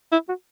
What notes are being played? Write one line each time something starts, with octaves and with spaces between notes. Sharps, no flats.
E4
F#4